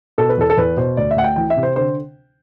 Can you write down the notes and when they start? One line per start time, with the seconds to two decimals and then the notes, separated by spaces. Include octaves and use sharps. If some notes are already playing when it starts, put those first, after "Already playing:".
0.18 B2 A4
0.29 B4
0.37 E2 A4
0.50 A4
0.57 E2 B4
0.77 B2 C5
0.97 D2 D5
1.11 E5
1.16 D2 F#5
1.24 G5
1.36 E3 G5
1.50 E5
1.57 C3
1.63 C5
1.76 D3 C5